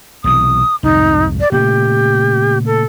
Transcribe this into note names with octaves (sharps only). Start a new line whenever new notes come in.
B1 C3 E3 D#6
C2 F2 G#2 D#4
D5
A#2 C#3 A3 G4
A4